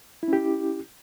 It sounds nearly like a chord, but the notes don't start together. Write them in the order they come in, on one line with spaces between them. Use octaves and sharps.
E4 C#4 G4